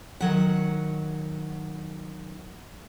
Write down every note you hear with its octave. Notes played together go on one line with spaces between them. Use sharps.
D#3 F#3 F#5